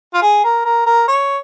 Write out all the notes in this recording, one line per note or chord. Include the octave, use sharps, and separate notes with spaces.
F4
G#4
A#4
A#4
A#4
C#5